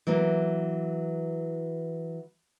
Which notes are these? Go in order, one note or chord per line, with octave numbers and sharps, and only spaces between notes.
E3 F#3 A#3